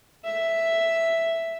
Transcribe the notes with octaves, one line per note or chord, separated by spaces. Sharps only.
E5